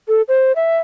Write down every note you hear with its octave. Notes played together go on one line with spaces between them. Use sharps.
A4
C5
E5